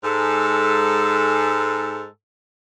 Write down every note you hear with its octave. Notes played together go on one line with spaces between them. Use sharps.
G#2 A4